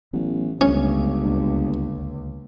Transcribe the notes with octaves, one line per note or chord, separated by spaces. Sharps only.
A1 E3 F#3 B3
G1 C#2 A3 C#4
D2 A#3 D4